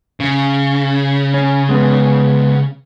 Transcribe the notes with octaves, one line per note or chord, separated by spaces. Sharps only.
C#3
C#4
G#3 B3